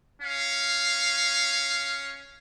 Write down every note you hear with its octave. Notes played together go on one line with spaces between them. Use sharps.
C#4 F5